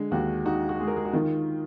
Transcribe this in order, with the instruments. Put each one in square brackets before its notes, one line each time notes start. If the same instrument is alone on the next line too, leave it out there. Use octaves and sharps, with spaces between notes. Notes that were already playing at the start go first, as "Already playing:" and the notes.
Already playing: [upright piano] D3 [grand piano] G#3
[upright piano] D#2 [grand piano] F#4
[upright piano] D#4 [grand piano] F#4
[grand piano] F#4
[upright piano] G#3 [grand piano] G#4
[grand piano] A#4
G#4
F#4
[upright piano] D#3 [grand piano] F4